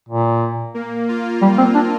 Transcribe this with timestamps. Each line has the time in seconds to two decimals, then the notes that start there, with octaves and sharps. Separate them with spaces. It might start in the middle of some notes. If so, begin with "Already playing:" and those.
0.09 A#2
0.74 A#3
1.08 F4
1.42 G3
1.58 C4
1.75 D4